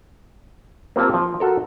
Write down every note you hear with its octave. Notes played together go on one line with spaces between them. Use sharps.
A#3 C4 F4 G4 A5
F3
F#4 A4 A#4